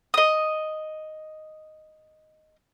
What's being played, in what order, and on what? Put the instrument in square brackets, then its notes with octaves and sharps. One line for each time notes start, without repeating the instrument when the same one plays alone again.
[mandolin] D#5 D#6